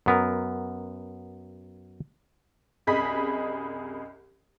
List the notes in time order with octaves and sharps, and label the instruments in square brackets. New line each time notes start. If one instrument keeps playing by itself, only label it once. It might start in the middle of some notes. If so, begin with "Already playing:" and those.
[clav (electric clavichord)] F#2 B3 A#4
[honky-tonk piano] C2 F#2 G#4 D#5 B5 B6